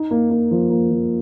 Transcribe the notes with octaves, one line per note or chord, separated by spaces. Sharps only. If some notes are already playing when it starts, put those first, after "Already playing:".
Already playing: D#4
A#3
A#3
F3
A#3
F3